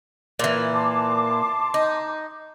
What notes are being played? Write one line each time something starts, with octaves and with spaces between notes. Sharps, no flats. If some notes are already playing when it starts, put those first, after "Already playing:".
A#2 E3
A5 C6 D6
D#4